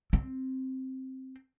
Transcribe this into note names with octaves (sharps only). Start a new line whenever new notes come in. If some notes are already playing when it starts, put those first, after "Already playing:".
C4